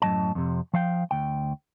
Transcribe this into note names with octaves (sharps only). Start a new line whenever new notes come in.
F#2 A2 C3 F#3 D#5 A5
F2 C3
F3 F5 G5
D2 G5